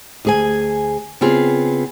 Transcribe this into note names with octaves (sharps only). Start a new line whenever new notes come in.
D2 G#4 G#5
C#3 B3 C4 F4 G#4